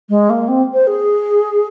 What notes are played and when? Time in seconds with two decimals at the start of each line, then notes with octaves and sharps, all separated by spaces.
0.09 G#3
0.30 A#3
0.48 C4
0.74 C5
0.87 G#4